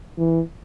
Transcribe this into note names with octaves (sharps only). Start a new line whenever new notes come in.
E3